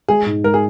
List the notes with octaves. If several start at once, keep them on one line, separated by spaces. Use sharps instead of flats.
G#3 G#4
G#2
G#3 A#4
G#4